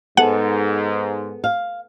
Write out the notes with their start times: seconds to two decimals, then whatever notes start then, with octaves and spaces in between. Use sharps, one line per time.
0.17 G#2 B3 G#4 A4 F#5
1.44 F5